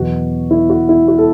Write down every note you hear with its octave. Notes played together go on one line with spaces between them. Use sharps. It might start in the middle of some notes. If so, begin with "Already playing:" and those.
Already playing: E2 B2 F#3 F#4
E4
F#4
E4
F#4
A4